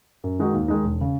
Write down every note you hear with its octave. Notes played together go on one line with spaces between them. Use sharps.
F#2
D#3 G#3 D#4 F#4
D#2
D#3 G#3 D#4
E1
C#3